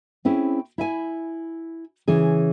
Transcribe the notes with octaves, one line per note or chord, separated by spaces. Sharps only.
C4 C#4 E4 G#4
E4 E5 G#5
C#3 E3 C#4 G#4